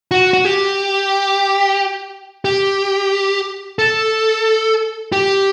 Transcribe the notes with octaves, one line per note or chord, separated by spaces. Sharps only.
F#4
F#4
G4
G4
A4
G4